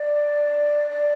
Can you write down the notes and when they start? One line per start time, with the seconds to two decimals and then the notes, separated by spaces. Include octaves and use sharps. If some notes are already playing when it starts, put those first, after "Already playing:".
Already playing: D5
0.91 D5